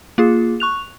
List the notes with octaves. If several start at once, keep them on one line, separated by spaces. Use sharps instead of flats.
A#3 F4 G#4
C#6 F#6 F7